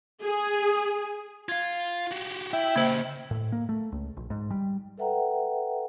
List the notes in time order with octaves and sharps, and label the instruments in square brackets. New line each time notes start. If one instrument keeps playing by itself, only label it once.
[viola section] G#4
[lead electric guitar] F4 F5 [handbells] G#6
[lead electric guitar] F#4 G4
[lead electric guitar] E4 [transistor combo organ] E5 G5
[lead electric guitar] C#3 G4 [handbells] A#3 C5
[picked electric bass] A2
A#3
A3
C#2
A#1
G#2
G3
[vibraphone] A4 B4 E5 F#5 G5 A#5